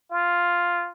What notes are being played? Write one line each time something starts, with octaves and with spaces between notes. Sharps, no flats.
F4